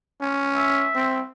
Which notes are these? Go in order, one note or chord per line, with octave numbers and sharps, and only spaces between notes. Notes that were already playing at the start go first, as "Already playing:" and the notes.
C#4
E5
C4